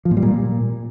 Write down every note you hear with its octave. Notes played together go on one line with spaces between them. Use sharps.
F3
A#2
G3
A#2